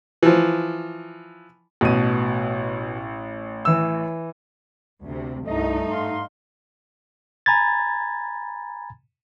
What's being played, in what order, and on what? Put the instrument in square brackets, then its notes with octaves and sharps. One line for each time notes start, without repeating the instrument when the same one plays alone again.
[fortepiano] E3 F3
[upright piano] A1 D#7 [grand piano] B2
[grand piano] E3 E6
[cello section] D2 C3
[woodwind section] C2 D#5 [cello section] G2 D#4 [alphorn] A3
[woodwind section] G#2 F5 C6
[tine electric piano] G#5 A#5 B5 G#6 A6